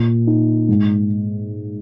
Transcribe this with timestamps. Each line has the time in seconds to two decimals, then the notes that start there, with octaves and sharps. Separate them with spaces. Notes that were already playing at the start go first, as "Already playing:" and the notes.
Already playing: A#2
0.27 D#4
0.68 G#2